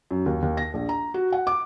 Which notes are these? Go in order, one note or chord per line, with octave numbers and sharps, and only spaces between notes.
F#2
D#2
D#2
A#6
A#1
A#5
F#4
F#5
D6